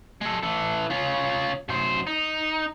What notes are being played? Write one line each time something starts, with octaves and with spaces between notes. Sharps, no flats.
G#3 A4
E3 A4
C#4 F4
F#2 C5
D#4